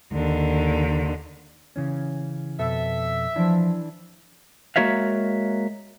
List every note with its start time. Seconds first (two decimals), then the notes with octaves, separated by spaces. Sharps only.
0.12 D#2 D3
1.76 C#3 E3 C#4
2.59 F2 B2 A4 E5
3.36 E3 F3 D4
4.76 G#3 A#3 F#4 C#5 E5 F5